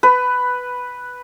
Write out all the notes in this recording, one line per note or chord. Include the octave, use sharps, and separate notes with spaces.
B4